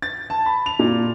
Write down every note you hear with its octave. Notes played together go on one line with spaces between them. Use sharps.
A6
A5
B5
F7
A#2